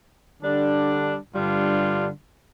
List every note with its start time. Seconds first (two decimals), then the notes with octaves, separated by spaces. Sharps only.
0.42 D3 G3 D4
1.34 G2 D3 G3 D4 F4